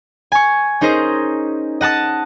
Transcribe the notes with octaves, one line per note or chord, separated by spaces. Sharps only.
G#5 C#6
C#4 D#4 G#4 A#4 C5 D#5
D#5 F#5 A5 D#6